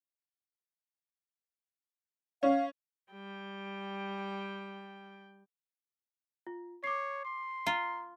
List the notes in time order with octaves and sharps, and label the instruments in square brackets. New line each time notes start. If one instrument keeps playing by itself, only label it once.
[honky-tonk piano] C#4 [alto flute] F5
[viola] G3 G5
[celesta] F4
[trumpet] C#5 [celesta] D6 C7
[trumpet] C6
[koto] F4 [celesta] A#5